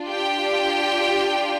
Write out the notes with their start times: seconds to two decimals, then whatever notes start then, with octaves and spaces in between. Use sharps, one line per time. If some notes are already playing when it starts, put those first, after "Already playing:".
Already playing: D4 F4
0.09 G4 G5